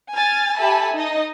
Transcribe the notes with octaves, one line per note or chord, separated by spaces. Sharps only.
G#5 F6 A6
G4 A4 E5 G#5 A5 B5
D#4 D#5